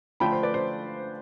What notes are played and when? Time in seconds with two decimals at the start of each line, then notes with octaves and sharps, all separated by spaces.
0.20 D3 F3 A3 D4 F4 G5 B5
0.32 C5
0.43 B4 D5
0.54 C5